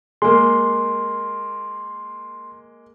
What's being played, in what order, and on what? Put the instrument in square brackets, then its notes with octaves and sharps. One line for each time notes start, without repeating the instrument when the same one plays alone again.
[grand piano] G#3 A#3 [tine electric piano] C6